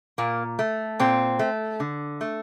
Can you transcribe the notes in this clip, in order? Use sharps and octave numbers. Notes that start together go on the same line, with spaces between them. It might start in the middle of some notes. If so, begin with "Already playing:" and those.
A#2 A#3
A3
A#2 C4
A3
D3
A3